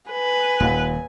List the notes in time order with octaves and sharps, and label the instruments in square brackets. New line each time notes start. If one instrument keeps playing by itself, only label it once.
[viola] B4 [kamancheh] G#5
[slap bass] D#1 [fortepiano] D#2 A#2 F#5